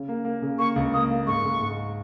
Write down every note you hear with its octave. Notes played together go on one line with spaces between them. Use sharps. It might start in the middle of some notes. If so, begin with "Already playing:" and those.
Already playing: C#3 C#4
A#3
A#3
C#3
A#3 C#6
C#2
A#3 D#6
A#3
G#2 C#6
G#2
G#2